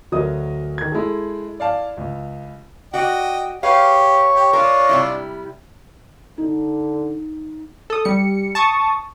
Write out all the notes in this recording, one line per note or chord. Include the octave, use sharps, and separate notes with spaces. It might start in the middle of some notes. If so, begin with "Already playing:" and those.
D2 F#3 A#4 D#5 D#6
D#3 G#6
G#3 E4 G#4 A4
D5 F5 A5
C#2
F#4 D5 D#5 G5
G4 G#4 B4 C#5 F5
G4
D4 F4 A#4
C3 G3 E4
D3 D#4
A4 D#6
G3 C#7
A5 C#6 D#6